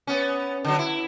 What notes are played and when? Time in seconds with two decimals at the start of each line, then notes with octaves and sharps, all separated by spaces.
0.07 B3 C#4
0.65 D3 F#3
0.79 E4